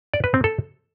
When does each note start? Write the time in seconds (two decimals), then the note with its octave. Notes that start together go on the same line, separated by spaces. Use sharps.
0.14 D5
0.24 B4
0.34 C4
0.44 A4